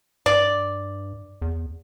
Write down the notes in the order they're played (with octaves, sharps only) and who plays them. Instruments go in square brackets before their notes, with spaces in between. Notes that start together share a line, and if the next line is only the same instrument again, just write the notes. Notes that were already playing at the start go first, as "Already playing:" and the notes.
[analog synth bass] G2 [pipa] D5
[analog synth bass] E2